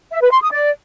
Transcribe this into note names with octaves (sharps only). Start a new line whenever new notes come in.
E5
B4
C6
D#6
D5